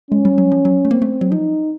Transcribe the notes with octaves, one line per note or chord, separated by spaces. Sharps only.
G#3 C#4
G3
F#3
F3
F#3
A3
A#3 C4
A3
F#3
F3 D#4